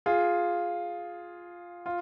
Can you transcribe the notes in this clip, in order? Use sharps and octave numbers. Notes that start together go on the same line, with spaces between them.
F4 G#4
F4